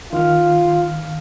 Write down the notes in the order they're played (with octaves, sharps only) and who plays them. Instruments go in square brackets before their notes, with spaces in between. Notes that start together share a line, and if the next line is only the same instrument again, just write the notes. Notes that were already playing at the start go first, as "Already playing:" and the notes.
[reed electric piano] D#3 F5 F6 [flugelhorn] F4